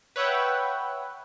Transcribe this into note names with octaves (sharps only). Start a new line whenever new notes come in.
B4 C#5 E5 F#5 G5